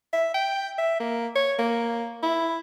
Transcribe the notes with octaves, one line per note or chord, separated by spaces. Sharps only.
E5
G5
E5
A#3
C#5
A#3
E4